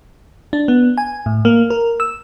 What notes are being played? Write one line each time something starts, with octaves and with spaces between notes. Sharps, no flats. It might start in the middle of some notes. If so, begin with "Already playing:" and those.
D4
B3
G#5
A2
A#3
A#4
E6